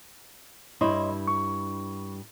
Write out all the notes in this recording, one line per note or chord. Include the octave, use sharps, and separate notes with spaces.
G2 E4 C#5 D#5 C6
C#6